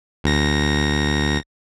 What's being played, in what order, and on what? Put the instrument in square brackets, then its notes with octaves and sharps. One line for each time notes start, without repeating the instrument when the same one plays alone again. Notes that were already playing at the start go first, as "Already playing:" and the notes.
[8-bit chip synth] D2 A#6